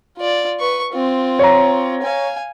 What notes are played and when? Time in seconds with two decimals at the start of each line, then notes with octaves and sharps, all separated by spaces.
0.17 F4 D5
0.60 B4 C#6
0.93 C4 F4
1.39 C#5 A#5
2.02 F5 G#5